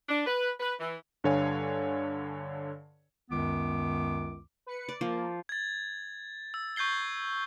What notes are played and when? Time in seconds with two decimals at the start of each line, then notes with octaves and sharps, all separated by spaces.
0.09 D4
0.26 B4
0.60 B4
0.80 E3
1.24 G2 D3 A4 C#5 F5 G#5
3.30 C#2 F#2 D#3 B3 D6
4.66 B4 C#7
4.89 D5
5.01 F3 A#3
5.49 G#6 A6
6.54 E6
6.76 C#6 G6 G#6 C7 G7